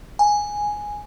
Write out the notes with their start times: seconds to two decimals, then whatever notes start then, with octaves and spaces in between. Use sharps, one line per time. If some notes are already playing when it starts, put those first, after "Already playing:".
0.19 G#5